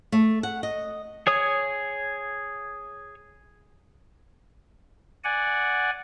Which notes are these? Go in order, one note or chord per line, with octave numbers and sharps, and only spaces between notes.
A3
F#5
D#5
G#4 C#5 D#6
D5 F#5 G#5